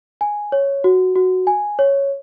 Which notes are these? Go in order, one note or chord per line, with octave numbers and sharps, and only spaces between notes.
G#5
C#5
F#4
F#4
G#5
C#5